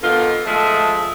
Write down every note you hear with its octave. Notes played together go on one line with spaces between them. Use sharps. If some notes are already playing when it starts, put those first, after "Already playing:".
D3 D#3 B3 F4
F3 G#3 A3 A4 E5